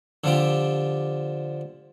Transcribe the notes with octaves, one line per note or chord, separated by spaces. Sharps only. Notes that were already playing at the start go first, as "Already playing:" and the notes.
D3 F3 G4